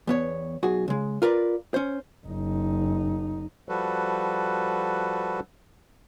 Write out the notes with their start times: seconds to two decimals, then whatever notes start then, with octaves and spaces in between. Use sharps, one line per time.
0.07 E2 B3 C#5
0.63 B1 F#4 G#4
0.88 C#3 G#3
1.22 F4 A#4 B4 D5
1.74 C#4 C5
2.27 F#1 D#4
3.69 F3 G3 F#4 A4 B4